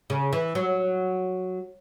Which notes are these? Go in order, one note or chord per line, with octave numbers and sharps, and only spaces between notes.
C#3
E3
F#3